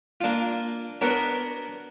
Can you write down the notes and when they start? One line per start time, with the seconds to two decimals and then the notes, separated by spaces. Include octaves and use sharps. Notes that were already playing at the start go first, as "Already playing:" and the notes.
0.21 A#3 D4 F4
1.01 B3 D4 F#4 A#4 C#5